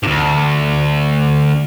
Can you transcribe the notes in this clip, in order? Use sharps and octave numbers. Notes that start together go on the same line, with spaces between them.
D2 G2